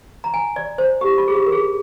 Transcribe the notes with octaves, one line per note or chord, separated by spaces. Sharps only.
A#5
G#5
D5
C5
G4
F4
G#4
G4
A#4
G#4